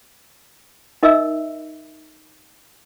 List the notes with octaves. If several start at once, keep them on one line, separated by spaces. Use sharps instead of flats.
D#4 A#4 D#5 E5 E6